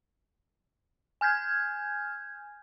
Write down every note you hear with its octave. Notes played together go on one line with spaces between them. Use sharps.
G#5 F6 G6 G#6